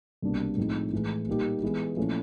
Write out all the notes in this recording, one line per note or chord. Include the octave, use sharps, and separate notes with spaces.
C2 B2 G3 A#3 D4
A2 F3 G#3 C4 D#4
A2 E3 G#3
A#2 G3 A#3 D#4 G4
E3 G#3 B3
A#2 F3 A3 C#4 E4